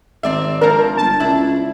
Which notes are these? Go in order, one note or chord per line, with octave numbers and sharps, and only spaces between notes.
G#1 C4 D5 E5
F3 A#3 D4 A#4
G1 A5
C#2 D4 E4